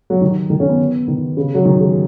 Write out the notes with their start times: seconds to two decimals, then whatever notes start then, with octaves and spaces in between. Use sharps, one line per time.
0.10 F#3
0.21 D#3
0.50 D#3
0.60 C#4
0.69 B3
1.08 D#3
1.37 C#3
1.55 F#3
1.65 D#3
1.80 G#3